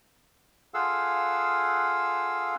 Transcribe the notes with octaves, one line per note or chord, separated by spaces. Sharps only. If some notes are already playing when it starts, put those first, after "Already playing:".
F4 G#4 A4 F5 F#5 E6